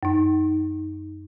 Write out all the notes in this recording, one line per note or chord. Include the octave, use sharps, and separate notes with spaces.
F#2 D#4